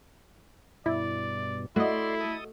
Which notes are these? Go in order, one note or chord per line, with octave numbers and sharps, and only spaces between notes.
G2 B2 E4 D5
A3 E4 F#4 D5 D#5 C6
A4 D#6